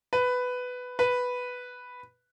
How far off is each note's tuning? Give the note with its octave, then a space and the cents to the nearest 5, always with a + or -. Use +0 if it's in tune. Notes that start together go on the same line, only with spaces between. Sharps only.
B4 +10
B4 +0